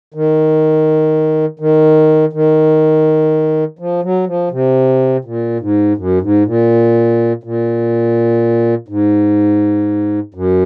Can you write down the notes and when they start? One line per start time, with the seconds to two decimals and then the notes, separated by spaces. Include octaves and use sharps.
0.14 D#3
1.60 D#3
2.33 D#3
3.79 F3
4.03 F#3
4.27 F3
4.51 C3
5.25 A#2
5.60 G#2
5.97 F#2
6.21 G#2
6.45 A#2
7.43 A#2
8.88 G#2
10.34 F#2